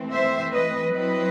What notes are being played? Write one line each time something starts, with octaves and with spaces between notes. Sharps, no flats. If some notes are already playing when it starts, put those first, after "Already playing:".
Already playing: E3 A3 C4
C5 E5
B4 D#5
F#3 C4 E4 B4 D#5